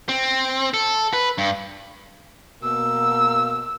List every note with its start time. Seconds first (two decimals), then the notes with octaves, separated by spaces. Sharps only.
0.09 C4
0.74 A4
1.13 B4
1.38 G2
2.64 B2 A#3 E6